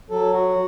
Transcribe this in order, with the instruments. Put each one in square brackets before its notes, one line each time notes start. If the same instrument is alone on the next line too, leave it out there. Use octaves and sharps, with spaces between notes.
[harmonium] F#3 A4
F#4